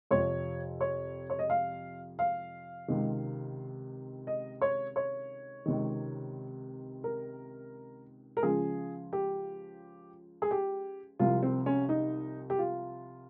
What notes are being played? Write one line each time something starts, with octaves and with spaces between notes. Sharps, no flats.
F2 C3 F3 C#5
C#5
C#5
D#5
F5
F5
C#2 C3 D#3
D#5
C#5
C#5
C#2 C3 D#3
A#4
A#4
C#2 C#3 F3 G#4
G4
G#4
G4
C2 C3 F3 F4
C4
C#4
D#4
G4
F4